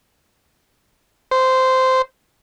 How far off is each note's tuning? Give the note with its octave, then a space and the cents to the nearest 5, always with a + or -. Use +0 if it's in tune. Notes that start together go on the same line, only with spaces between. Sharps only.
C5 -10